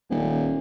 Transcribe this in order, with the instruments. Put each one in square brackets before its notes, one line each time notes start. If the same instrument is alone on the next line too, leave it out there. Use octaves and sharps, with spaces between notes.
[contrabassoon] D#1